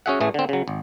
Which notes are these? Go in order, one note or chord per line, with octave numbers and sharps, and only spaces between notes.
C#4 F#4 G#4 E5 F#5
A1 A2 E3 A3 G#4
D3 C4
C#3 F#3
G#1